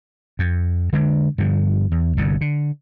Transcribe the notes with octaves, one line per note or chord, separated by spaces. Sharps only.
F2
D3 G#3 D4
G2 D3 F3
E2
G1 C2 G2 D3
D3